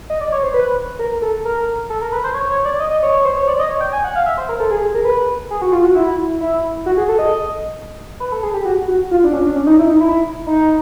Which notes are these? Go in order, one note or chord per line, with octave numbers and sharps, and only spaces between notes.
D#5
D5
C#5
C5
B4
A#4
A4
A#4
A4
A#4
B4
C5
C#5
C#5
D5
D#5
D#5
C#5
C#5
C5
C#5
D5
D#5
C#5
G5
G#5
F#5
F5
E5
C5
A#4
A4
G#4
G#4
A#4
B4
G#4
F#4
F4
F#4
E4
E4
F#4
G#4
A4
D#5
B4
A4
G#4
G4
F#4
F#4
F4
D4
C#4
D4
C#4
D#4
E4
D#4
E4
D#4